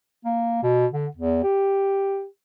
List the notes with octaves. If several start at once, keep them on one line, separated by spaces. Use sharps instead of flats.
A#3
B2
D3
E2
G4